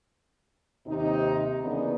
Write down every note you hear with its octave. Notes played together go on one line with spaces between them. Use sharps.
D#2 C3 D#4
C#3 E3 A#3 B3 D4 D#4